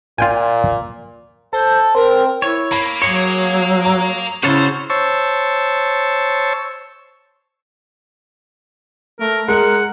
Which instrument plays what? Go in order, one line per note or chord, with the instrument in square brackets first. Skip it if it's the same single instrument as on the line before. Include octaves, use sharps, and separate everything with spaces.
[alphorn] A#2 [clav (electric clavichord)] F4 G5 G#5
[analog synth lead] A4 [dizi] C5
[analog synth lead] C4 [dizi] A#4
[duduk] E4 [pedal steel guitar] C#5
[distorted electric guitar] A#3 [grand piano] B5
[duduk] F#3 [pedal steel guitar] G#4 C#5 [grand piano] C#7
[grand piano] A#5
[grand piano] C#3 [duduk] E4 [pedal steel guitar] F#4 C#5 A5 [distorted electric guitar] C5
[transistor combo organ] C5 C#5 A5 C#6 E6
[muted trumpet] A3 [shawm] A#4
[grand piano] G#3 [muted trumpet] A#4 [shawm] F#5